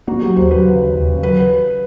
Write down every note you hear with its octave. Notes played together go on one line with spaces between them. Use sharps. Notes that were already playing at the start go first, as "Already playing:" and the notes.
A#3 F#4
F#3 G4
D#2 C5
F#3 B4
C#3
D#2
D#2
C#3
F#3 B4